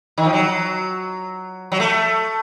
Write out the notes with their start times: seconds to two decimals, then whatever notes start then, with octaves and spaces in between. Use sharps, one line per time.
0.18 D#3
0.26 F3
0.33 F#3
1.72 F#3
1.80 A3